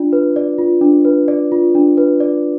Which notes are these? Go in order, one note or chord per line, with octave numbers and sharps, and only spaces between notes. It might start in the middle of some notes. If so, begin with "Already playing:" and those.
Already playing: D4 F4 D5
B4
D5
F4
D4
B4
D5
F4
D4
B4
D5